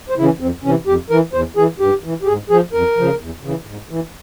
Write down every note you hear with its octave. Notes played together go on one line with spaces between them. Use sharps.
C5
C#3 E3 C#4 E4
F2 C4
C3 E3 C#4
F2 G4
E3 A#4
E2 C5
E3 G#4
G2 G4
E3
G4
G#2 G#4
F3 G#4
F2 A#4
C#3 F3
E2
C#3 E3
G#2
E3